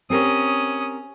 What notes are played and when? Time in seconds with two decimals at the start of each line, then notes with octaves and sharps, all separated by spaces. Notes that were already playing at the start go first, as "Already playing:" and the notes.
0.10 C4 C#4 G4 A#4 D#6